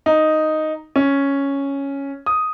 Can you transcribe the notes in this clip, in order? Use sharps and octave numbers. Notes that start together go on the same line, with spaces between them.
D#4
C#4
D#6